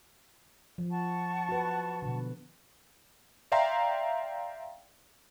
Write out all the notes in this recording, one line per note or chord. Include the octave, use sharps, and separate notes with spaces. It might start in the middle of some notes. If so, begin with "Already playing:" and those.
F3
F#5 A5 C#6
F#4 B4
B2 D3
D5 E5 F5 G5 A#5 C6